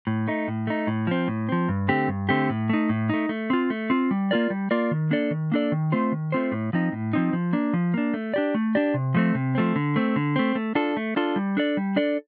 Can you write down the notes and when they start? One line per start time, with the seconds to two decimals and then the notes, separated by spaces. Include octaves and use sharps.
0.07 A2
0.28 A3 D#4
0.48 A2
0.67 A3 D#4
0.87 A2
1.07 F3 C4
1.28 A2
1.49 F3 C4
1.69 G2
1.88 D3 A3 C4 G4
2.08 G2
2.29 D3 A3 C4 G4
2.50 A2
2.69 A3 D#4
2.89 A2
3.09 A3 D#4
3.29 A3
3.50 C4 F4
3.70 A3
3.90 C4 F4
4.11 G3
4.31 A#3 F4 A#4 D5
4.50 G3
4.71 A#3 F4 A#4 D5
4.91 D#3
5.11 A#3 D4 A4 D5
5.31 D#3
5.52 A#3 D4 A4 D5
5.72 D#3
5.92 A3 C4 F4 C5
6.12 D#3
6.32 A3 C4 F4 C5
6.52 A2
6.73 F3 C4 D#4
6.92 A2
7.13 F3 C4 D#4
7.33 F3
7.53 A#3 D4
7.73 F3
7.94 A#3 D4
8.14 A3
8.34 D4 G4 D5
8.55 A3
8.75 D4 G4 D5
8.94 C3
9.14 F3 A3 C4
9.35 C3
9.55 F3 A3 C4
9.76 D3
9.96 A3 C4
10.16 D3
10.36 A3 C4
10.55 A3
10.75 D4 F4 A4
10.97 A3
11.16 D4 F4 A4
11.36 G3
11.57 D4 A4 D5
11.77 G3
11.96 D4 A4 D5